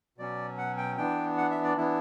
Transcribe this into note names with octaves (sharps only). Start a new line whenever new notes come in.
B2 F#3 C#4 D5
F#5
G5
E3 B3 D4 G5
F#5
E5
D5
E3 B3 D4 E4